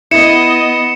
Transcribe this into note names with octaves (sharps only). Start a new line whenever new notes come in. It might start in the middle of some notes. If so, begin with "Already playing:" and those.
B3 E4 D#5 C#7 E7